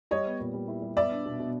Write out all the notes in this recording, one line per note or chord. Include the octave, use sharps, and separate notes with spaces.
G3 C#5 D#5
B3
A#2
G3
E4
G3
B3 D5 E5
D4
B2
B2